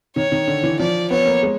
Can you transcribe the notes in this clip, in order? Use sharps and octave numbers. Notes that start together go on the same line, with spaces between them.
D#3 C#5
D#3
D3
E3
F3 D5
B3 C#5
A#3
G#3